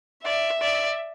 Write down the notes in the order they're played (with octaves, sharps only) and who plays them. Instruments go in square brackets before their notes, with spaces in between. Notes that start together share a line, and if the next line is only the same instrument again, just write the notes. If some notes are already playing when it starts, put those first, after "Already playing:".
[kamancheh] D5 [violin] E5
[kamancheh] D5